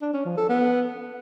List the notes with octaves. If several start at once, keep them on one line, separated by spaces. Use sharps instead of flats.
D4
C#4
F3
A4
B3